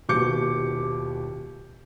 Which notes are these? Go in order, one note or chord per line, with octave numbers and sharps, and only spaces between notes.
D#1 D#2 B2 D6 G6 C#7